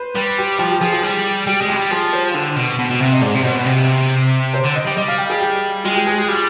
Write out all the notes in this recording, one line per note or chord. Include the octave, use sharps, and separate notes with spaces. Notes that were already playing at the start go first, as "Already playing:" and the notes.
Already playing: B4 C5
G3 B4
G4
F3 G4
G4
F3 G#4
G#4
G3
G3 G4
G#3
F3 G4
G3
F3 G#4
C5
D3
B2
B2
B2
C3
D#5
G#2 D5
C3
B2 C5
C3
C5
D3
D#5
G3
G3 D#5
F5
G5
G#4
G4
G#3 F4
G4
G#4
G4
G3 F4